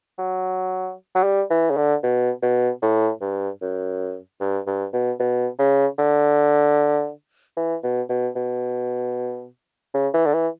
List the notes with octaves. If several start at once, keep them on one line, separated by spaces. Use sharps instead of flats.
F#3
F#3
G3
E3
C#3
D3
B2
B2
A2
G2
F#2
G2
G2
B2
B2
C#3
D3
E3
B2
B2
B2
C#3
E3
D3
E3